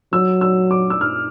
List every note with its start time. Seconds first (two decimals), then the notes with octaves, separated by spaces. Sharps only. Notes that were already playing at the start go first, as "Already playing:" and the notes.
0.13 F#3 E6
0.41 E6
0.71 D6
0.90 E6
1.01 F6